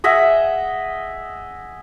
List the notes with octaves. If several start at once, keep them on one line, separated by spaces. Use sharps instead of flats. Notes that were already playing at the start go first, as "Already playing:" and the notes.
G#4 D#5 E5 F#5